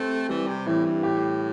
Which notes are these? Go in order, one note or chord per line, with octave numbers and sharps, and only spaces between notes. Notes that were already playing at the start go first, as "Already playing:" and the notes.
Already playing: A3 C4 G4
E3 G3
C3
A2 E3
G2
A2 G4